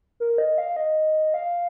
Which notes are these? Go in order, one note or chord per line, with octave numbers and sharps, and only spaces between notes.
A#4
D#5
F5
D#5
F5